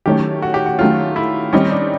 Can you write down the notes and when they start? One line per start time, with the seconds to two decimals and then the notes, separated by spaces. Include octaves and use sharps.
0.06 D#3 F#3 A3 C#4 G4
0.42 F#4
0.54 G4
0.66 F#4
0.79 D#3 F#3 A3 C#4 F4
1.16 E4
1.53 D#3 G3 C4 C#4 D#4
1.71 D4